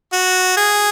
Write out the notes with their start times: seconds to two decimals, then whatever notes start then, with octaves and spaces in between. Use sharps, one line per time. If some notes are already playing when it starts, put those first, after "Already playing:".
0.13 F#4
0.57 G#4